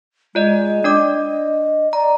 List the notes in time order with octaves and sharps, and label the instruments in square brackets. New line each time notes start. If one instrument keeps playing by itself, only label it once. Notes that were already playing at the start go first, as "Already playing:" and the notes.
[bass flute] G#3 [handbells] F4 D5 D#5
[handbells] D4 D5 D6 [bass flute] D#5
[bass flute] D5 [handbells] A#5